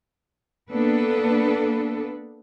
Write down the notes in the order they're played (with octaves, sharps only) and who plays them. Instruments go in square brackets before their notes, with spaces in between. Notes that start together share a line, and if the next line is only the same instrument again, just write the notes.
[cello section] A#3 B3 D4 A4 B4